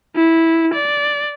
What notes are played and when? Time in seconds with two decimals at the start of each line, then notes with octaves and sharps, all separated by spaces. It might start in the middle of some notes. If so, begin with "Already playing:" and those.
0.16 E4
0.74 D5